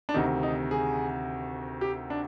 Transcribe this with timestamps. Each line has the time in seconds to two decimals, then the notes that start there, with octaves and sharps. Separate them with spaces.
0.09 D4
0.14 D2 C3 D#3 D#4
0.43 D#4
0.71 G#4
1.81 G4
2.10 D4